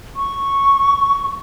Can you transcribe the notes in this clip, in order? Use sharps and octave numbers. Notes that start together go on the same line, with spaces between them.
C#6